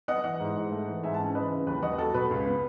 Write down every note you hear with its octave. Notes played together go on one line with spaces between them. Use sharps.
B3 D#5 F#5
E3 D#5 F#5
G#2
G#2
A3
E3
G#2 E5 G#5
F#5 A5
C#4
E3 B4 D#5
C#3
D#2 B4
D#2 D#5 F#5
F#3 A4
B2 B4
C#2
B3